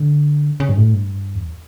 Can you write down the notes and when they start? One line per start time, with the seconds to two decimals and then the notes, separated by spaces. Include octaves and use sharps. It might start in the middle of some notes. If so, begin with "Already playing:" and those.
Already playing: D3
0.60 C#3
0.69 G2
0.77 A2
0.94 G2
1.35 E2